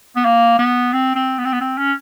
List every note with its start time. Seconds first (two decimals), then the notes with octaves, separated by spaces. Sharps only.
0.16 B3
0.25 A#3
0.59 B3
0.93 C4
1.15 C4
1.38 B3
1.45 C4
1.52 B3
1.61 C4
1.78 C#4